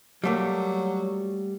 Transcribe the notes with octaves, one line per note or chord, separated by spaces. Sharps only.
F#3 G3 A3 A#3